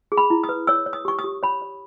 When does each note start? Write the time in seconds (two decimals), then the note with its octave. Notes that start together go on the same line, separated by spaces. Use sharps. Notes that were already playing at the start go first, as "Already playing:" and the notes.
0.12 G#4
0.18 B5
0.30 E4
0.44 D#6
0.49 B4
0.67 C#5 E6
0.86 C#5
0.93 D#6
1.05 G4 C#6
1.19 D#6
1.24 G4
1.43 C#5 B5
1.62 C#5